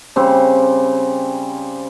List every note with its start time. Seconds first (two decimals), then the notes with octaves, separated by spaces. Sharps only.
0.16 C#3 G3 C4